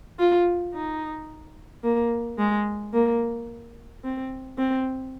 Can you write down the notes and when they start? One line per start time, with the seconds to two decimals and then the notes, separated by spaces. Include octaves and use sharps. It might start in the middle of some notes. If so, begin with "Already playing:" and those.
0.19 F4
0.75 D#4
1.84 A#3
2.39 G#3
2.93 A#3
4.04 C4
4.58 C4